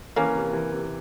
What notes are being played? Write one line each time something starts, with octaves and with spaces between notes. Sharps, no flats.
E3 A#3 C#4
C3
E3
C3